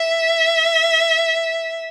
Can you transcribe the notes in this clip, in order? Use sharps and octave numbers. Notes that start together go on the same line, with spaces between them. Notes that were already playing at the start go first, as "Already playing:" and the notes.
Already playing: E5